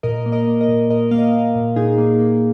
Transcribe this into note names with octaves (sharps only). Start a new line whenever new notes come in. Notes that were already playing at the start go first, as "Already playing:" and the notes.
A#2 A#4 D#5
A#3
A#4 D#5
A#3
A#4 D#5
A#2
A#2 A#4 D#5
A#3 F5
A#4 D#5
A#3
A#2
A#2 D#4 G#4
A#3
A#3